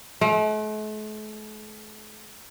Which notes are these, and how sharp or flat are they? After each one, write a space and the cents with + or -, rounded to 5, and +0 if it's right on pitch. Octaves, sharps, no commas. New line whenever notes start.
A3 -45